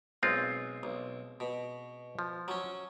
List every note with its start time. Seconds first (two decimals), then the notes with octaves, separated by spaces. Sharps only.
0.23 B1 G#3 C4 F4
0.83 B1
1.40 B2
2.19 F3
2.48 F#3 C#4